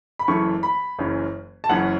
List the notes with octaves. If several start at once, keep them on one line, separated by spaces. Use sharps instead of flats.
B5
F#1 F#2 E3 A3 C#6
B5
F#1 F#2 E3 C#4
A5
F#1 F#2 E3 C#4 F#5